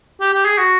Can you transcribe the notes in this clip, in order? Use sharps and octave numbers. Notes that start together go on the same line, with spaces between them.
G4
G4
G#4
F#4